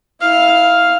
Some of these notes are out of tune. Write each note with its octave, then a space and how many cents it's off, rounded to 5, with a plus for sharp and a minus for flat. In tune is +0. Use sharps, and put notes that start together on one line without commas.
E4 -20 F5 +0